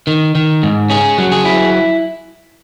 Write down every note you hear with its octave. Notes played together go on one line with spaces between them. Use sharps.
D#3
D#3
G#2
C#4 G#4
F#3
G#4
E4